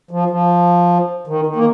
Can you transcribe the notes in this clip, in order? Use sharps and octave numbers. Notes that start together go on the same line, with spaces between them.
F3
F3
D#3
D#3
A#3